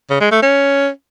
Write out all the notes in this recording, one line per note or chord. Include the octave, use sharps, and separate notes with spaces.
C#3
G#3
A3
C#4